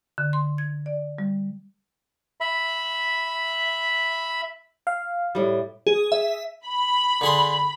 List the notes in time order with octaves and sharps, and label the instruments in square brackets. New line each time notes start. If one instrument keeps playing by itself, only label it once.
[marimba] D3
C6
G#6
D5
G3
[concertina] E5 B5
[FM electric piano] F5
[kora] A2 G3
[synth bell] G#4
E5
[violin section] B5
[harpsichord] D3 G#4 C6